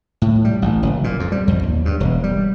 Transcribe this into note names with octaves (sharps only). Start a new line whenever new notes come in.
A2
G3
A1
F#1
A#2
F2
G3
F2
D#2
G2
E1
G3